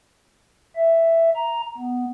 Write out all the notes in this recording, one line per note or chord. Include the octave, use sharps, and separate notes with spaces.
E5
A#5
B3